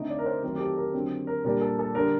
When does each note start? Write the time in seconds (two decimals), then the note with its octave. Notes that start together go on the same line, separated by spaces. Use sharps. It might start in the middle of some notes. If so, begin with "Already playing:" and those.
Already playing: D3 A3 C4 D#4 D#5
0.10 D5
0.19 A#4
0.26 C5
0.43 D#3 F#3 A3 C4 A#4
0.55 G4
0.60 A4
0.77 A#4
0.93 D3 F#3 C4
1.27 A#4
1.44 A#2 G3 D4 A#4
1.61 A4
1.79 A4
1.95 D3 G3 D4 A#4